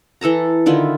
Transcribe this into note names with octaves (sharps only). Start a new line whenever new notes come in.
E3 A4 A5 A#5
D3 D#3 E4 F4